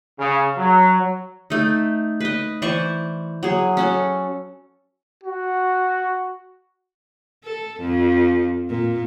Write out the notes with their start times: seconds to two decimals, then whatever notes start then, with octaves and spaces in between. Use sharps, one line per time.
0.19 C#3
0.57 F#3
1.50 A3 D#4
2.20 B4 D#5
2.62 E3 C5 D5 C#6
3.43 F#3 G#4
3.77 C#4 F#4 A4
5.23 F#4
7.44 A4
7.81 F2
8.69 A#2